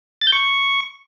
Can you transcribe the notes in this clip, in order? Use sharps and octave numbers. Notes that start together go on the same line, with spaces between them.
A6
G6
C#6